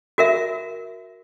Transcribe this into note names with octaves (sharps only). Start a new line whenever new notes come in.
F#4 A#4 E5